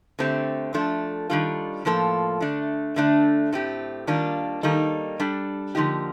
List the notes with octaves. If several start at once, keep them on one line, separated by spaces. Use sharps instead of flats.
D3 A3 C4 G4
F3 A3 D4 A4
D#3 G3 D4 F4 A4
A2 F3 A#3 F4 A4
D3 A3 D4
D3 A3 D4
A2 A3 C4 G4
D#3 G3 A#3 D4 F4
D#3 G3 A#3 D#4 A4
G3 D4 A4
D3 F3 A#3 D#4 G4